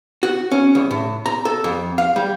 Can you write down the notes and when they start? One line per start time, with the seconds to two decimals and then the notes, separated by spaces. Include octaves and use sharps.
0.23 F#4
0.52 C#4
0.75 C2
0.91 A2
1.26 A#5
1.45 A4
1.64 F2
1.98 F5
2.16 G3